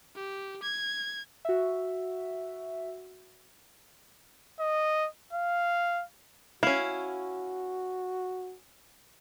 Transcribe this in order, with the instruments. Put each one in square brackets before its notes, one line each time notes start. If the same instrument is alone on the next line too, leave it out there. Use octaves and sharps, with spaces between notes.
[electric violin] G4
G#6
[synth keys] F#4 E5
[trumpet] D#5
F5
[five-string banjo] C#4 E4 [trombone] F#4 [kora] F5